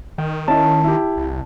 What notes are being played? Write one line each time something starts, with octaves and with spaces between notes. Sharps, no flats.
D#3 G5
C#4 E4 D#5 A5
E4 G4
C2